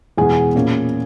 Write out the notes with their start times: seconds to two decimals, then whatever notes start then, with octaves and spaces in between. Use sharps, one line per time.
0.18 E2 B2 G#3 B3 G#4 G#5
0.55 A#2 A#3 C#4